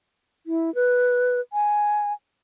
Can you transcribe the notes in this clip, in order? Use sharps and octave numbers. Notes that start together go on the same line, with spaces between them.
E4
B4
G#5